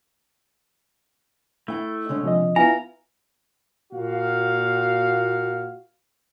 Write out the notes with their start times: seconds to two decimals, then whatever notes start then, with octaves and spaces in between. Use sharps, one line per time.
1.68 A3 E4 G5
2.09 D3 G#3 C#4
2.23 C3 F3 D#5
2.56 B3 E4 F4 G#5 A#5
3.93 A#2 F#4 F5